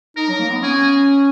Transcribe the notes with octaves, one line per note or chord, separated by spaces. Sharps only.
D#4 A#4
F#3
A#3
B3
C#4 G#4